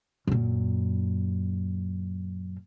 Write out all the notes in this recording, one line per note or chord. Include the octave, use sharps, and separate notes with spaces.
F#2 A#2